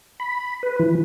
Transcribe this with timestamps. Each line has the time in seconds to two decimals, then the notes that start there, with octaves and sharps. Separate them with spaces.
0.20 B5
0.63 B4
0.79 E3